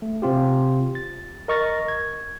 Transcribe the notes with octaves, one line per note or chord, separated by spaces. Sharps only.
A3
C3 C4 F4 G4
A6
A#4 D#5 C#6 F6 A6 A#6
G#6